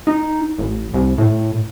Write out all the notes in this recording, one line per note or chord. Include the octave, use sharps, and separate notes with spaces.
D#4
A1
C2
A2